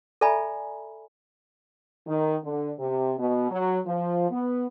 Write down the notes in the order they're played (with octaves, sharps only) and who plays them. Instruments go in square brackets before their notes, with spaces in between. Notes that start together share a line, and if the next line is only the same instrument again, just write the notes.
[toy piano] A4 D5 E5 G#5 A#5 B5
[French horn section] D#3
D3
C3
B2
F#3
F3
B3